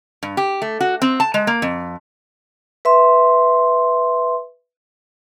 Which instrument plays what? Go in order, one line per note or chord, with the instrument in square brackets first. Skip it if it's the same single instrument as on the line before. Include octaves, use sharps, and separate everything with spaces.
[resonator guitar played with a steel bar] G2
G4
A3
F#4
C4
A5
G#3
A#3
F2
[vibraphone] B4 E5 C6